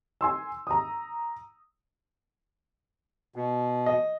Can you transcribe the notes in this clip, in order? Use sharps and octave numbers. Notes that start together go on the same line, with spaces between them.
G#5 C6 E6
A#5 D#6
B2
D#5